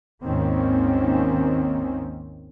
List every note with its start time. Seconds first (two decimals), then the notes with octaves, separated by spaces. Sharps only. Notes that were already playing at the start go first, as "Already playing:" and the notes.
0.23 G#1 D#2 D#3 A#3 C4 C#4